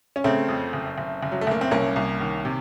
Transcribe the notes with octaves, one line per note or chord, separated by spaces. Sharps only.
C#4
C#3 A3 C4
F2
F#1
F#1
F#1
F#3
A3
F#1 A#3
C4
C2 A#3 C#4
C2
D#3
C3